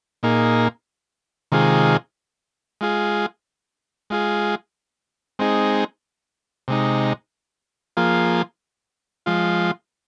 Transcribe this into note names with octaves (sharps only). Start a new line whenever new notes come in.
A#2 A#3 D#4 G#4
C3 D#3 G#3 F4 G#4
G#3 F4 G#4
G#3 F4 G#4
G#3 C4 D#4 G#4
C3 G#3 D#4
F3 A#3 F4 G#4
F3 G#3 F4